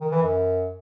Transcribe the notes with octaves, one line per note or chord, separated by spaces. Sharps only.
D#3
E3
F#2